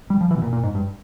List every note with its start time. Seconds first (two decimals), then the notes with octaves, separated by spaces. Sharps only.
0.10 G3
0.21 F3
0.31 E3
0.37 B2
0.42 A#2
0.53 A#2
0.63 G#2
0.75 G2